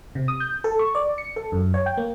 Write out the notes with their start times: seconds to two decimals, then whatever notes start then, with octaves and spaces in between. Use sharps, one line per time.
0.15 C3
0.28 D#6
0.40 G6
0.64 A4
0.79 C#6
0.95 D5
1.18 C#7
1.36 A4
1.52 F#2
1.74 C#5
1.86 G5
1.97 A#3